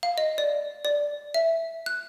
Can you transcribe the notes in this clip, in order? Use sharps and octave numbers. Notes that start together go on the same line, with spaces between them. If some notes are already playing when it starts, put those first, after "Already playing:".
F5
D#5
D5
D5
E5
F#6